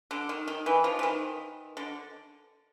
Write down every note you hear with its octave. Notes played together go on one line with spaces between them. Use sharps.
D3
D#3
D#3
E3
F3
E3
D#3
D3